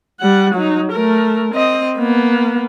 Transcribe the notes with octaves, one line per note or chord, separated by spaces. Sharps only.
G3 F#5
F#3 D#4
A3 A#4
C4 D#5
A#3 B3